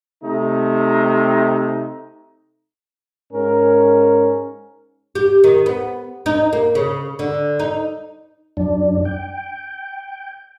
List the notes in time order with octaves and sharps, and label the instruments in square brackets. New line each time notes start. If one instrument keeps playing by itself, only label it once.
[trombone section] C3 A3 D#4
G#2 C#4 A#4
[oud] G4
D#3
B3
D#4
A#3
C#3
D3
D#4
[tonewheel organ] F#2 D4
G5